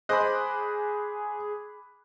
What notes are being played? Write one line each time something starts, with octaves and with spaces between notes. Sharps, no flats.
G#4 C5 D#5 B5 D6 F#6